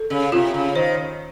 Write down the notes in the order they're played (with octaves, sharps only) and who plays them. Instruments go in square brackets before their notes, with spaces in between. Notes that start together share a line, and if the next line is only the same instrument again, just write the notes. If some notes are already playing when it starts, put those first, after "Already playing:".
Already playing: [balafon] A4
[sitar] C#3
[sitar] C3 [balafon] F4
[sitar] C#3
[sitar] D#3 [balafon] C5